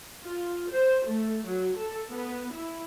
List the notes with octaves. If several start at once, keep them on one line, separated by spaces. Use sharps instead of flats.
F4
C5
A3
F#3
A4
B3
E4